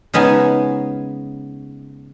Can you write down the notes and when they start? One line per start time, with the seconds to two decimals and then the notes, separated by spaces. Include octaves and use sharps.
0.14 C#3 G#3 B3 D#4 G#5 A5